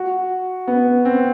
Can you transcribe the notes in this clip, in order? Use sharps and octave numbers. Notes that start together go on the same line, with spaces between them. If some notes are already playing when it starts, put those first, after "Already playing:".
Already playing: F#4
B3
C4